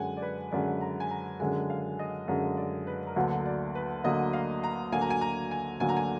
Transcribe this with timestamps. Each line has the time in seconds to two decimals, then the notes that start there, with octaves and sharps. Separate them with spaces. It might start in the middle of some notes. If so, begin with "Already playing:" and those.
Already playing: F#2 D3 G#3 F#5 G#5
0.17 D5
0.22 B4
0.52 F#2 D3 G#3 D5
0.81 A#5
1.00 G#5
1.10 A#5
1.40 F#2 D3 G#3 G#5
1.70 F5
1.99 D#5
2.28 F#2 D3 G#3
2.57 D5
2.87 B4
3.07 A#4
3.16 D2 D3 F#3 A#3 B4
3.46 D5
3.75 B4
4.04 D2 D3 F#3 A#3 D#5
4.33 F5
4.64 A#5
4.92 D2 D3 F#3 A#3 G#5
5.01 A#5
5.10 G#5
5.21 A#5
5.51 G#5
5.80 D2 D3 F#3 A#3 G#5
5.89 A#5
5.97 G#5